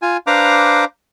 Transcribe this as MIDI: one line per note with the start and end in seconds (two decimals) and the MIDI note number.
0.02 0.17 65
0.02 0.17 80
0.27 0.85 62
0.27 0.85 71
0.27 0.85 72
0.27 0.85 77
0.27 0.85 82
0.27 0.85 86